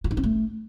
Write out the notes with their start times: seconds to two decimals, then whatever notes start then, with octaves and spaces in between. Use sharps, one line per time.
0.04 F4
0.11 D#4
0.17 C4
0.23 A3